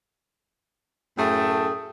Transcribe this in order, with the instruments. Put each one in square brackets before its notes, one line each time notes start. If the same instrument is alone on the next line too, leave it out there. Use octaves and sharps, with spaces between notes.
[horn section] F#2 A2 A3 G#4 G5 A5